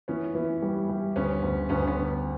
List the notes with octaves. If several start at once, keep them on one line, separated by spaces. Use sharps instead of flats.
E3 B3 C#4
E3
G3
G3
D2 B3 C#4
D2
D2 B3 C#4
B3 C#4